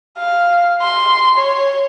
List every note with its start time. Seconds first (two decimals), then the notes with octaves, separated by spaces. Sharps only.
0.18 F5
0.82 C6
1.38 C#5